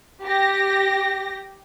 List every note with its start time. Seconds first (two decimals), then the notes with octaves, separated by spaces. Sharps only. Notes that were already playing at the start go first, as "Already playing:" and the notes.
0.24 G4 A#6